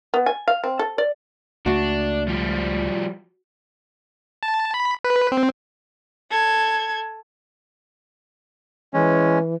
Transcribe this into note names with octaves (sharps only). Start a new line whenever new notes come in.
B3
G#5
F5
C4
A4
D5
C#2 A3 D4 F#4
F3 G3
A5
B5
B4
C4
A4 G#6
E3 G#3 C#4